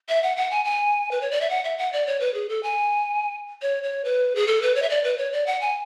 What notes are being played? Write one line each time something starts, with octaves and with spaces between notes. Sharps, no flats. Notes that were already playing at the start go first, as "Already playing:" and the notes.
E5
F#5
F#5
G#5
G#5
B4
C#5
D5
E5
F#5
E5
F#5
D5
C#5
B4
G#4
A4
G#5
C#5
C#5
B4
G#4
A4
B4
C#5
E5
D5
B4
C#5
D5
F#5
G#5